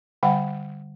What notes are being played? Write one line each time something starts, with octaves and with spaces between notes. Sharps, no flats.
D3 G3 F#5 G5